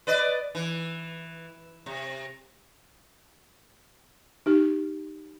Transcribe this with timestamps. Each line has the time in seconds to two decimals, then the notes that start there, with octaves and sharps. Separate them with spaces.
0.07 B4 D5 D#5
0.55 E3
1.86 C3
4.46 D#4 G4